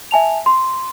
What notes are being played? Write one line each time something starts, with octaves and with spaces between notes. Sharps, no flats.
E5 G#5 A5 F7
C6